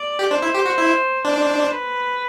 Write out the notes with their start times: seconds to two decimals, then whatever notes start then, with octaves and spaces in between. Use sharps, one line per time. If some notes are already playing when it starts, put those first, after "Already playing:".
Already playing: D5
0.19 G4
0.31 D4 C5
0.42 E4
0.54 G4
0.66 F#4
0.78 E4
1.25 D4 C5
1.72 B4